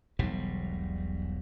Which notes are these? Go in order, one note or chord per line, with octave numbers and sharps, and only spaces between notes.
E1 B1 G#2 G3